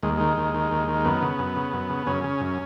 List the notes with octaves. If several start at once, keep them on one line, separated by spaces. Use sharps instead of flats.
D#2 G#3
D#3 G#3
D#2
D#3
D#2
D#3
F#2 B3
C#3
F#2
C#3
F#2
C#3
F#2 C#3 C#4
C#3
F#2